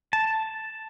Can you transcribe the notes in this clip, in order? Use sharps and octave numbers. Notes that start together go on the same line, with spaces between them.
A5